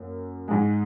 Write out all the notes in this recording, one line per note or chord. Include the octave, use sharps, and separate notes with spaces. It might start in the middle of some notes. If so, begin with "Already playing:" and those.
Already playing: F#2 A#3
G#2 G#3 G#4